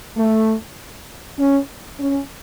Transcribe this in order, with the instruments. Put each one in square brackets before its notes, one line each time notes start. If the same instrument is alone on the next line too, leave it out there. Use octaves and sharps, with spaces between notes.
[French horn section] A3
C#4
C#4